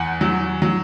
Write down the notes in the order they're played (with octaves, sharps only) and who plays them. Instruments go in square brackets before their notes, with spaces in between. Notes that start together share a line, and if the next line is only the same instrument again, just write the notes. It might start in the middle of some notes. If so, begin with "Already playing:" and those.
Already playing: [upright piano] E2 F#5
F#3
F#3